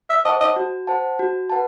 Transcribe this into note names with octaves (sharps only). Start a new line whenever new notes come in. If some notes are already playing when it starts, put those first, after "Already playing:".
E5
C5 D#5 F#5 A5
D#5
F#4
C5 F#5 A5
F#4
B4 F#5 A5